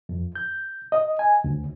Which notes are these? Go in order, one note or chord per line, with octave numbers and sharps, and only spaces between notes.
F2
G6
D#5
G#5
D2